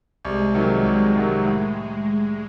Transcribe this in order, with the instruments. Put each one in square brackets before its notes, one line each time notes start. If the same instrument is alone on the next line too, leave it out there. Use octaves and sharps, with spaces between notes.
[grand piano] C2 [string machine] G#3
[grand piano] C3 D#3 F#3
C2
C3 D#3 F#3
[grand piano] A2 [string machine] G#3